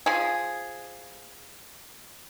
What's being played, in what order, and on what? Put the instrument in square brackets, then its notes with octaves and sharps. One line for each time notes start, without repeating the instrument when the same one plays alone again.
[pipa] F3 G#4